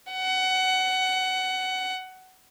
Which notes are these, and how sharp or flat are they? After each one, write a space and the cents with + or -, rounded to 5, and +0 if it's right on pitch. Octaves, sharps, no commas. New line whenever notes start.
F#5 +20